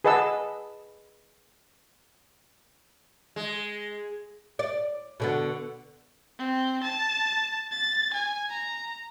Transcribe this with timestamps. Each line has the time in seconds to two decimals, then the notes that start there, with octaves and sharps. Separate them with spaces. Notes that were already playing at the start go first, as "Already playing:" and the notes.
0.04 G#4 B4 D#5 F#5 A5 E6
3.36 G#3
4.59 D5
5.20 B2 D3 B3
6.38 C4
6.83 A5
7.71 A6
8.14 G#5
8.50 A#5